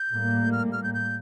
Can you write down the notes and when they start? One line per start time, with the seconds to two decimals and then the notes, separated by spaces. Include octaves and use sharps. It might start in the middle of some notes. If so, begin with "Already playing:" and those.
Already playing: G6
0.11 A2 G3 A#3
0.52 F6
0.73 F6
0.83 G6
0.94 G6